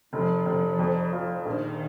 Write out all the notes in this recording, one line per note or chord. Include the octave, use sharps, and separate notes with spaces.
F1 F3
F1
F2
F4
A#1 D#3